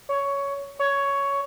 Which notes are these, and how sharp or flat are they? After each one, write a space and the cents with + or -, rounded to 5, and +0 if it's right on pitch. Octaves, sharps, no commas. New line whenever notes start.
C#5 +10
C#5 +10